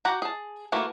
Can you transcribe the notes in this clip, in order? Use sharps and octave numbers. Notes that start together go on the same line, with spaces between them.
F#4 G4 F#5 A#5
G#4 A5
E3 A3 A#3 F#4